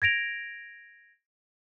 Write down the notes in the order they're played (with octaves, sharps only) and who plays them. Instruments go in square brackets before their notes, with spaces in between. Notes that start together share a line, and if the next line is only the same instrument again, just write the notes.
[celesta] G#6 A#6 D7 F7